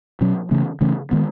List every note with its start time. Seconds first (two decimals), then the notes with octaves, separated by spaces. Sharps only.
0.21 B2 F#3 C#4
0.51 C#3 E3 A3 C#4
0.81 C#3 E3 A3 C#4
1.11 D#3 G#3 B3